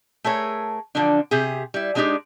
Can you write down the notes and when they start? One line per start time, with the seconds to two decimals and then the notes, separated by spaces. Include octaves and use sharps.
0.24 A3 G#4 A#4 C#5
0.95 D3 F3 F#3 D4
1.31 C3 G4 G#4
1.74 G3 E4
1.95 F#3 G#3 D4 D#4 G4 G#4